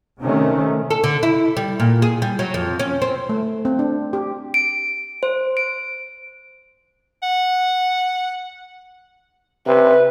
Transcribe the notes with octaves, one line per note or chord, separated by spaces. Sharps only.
C3 D#3 A3 C#4
A4
D3
E4
G3
A#2
G#4
G3
F#3
F2
C#4
C4
A3
C4
D4
G4
D7
C5
D7
F#5
C3 B4